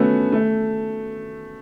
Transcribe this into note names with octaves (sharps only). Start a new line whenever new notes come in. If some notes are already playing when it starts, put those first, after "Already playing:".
Already playing: A3 B3 C#4 F#4
A3